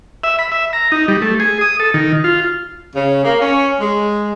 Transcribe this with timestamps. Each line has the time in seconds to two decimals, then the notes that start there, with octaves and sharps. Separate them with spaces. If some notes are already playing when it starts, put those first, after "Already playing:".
0.24 E5
0.39 B5
0.52 E5
0.73 A#5
0.92 D#4
1.08 G3
1.22 A3
1.40 G#4
1.61 D#6
1.80 A4
1.94 D#3
2.24 F4
2.96 C#3
3.24 A#3
3.41 C#4
3.80 G#3